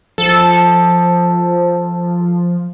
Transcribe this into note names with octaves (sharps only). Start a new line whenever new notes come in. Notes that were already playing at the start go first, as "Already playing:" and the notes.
F3 A4